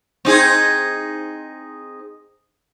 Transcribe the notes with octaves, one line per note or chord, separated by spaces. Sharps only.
C4 D#4 G#4